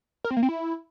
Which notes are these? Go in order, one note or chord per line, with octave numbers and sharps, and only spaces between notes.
A#4
C4
A#3
C4
E4